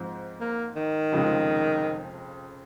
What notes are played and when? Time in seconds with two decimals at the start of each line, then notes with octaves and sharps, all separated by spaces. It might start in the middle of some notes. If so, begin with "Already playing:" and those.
Already playing: G#2 F3 C4 C5
0.40 A#3
0.76 D#3
1.12 F1 F2 C#3 F3 G#3